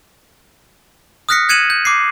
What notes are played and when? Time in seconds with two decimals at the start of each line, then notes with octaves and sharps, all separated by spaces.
1.29 D#6 F6 F#6 A#6 B6 C#7
1.49 F#6 G#6 C#7 D#7 E7 F#7
1.70 G6
1.85 D6 C7